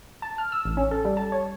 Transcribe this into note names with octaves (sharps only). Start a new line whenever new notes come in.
A5
F6
E6
A1
C#4
A4
G3
A5
C#5